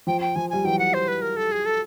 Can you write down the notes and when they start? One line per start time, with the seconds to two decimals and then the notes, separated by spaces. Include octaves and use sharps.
0.07 F3 G5
0.21 G5
0.35 F3 G#5
0.50 G3 G#5
0.64 E3 F#3 G5
0.79 F#5
0.94 C5
1.08 B4
1.22 A#4
1.36 A4
1.52 G#4
1.65 A4